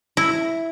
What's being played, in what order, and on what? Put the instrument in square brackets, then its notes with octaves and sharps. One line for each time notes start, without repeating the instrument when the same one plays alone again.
[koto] E4